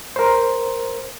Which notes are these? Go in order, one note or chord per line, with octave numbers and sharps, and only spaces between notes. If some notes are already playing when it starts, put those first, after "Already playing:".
A#4 C5